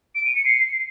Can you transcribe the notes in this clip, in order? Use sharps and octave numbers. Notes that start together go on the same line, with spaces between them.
D7
D#7
C#7
C7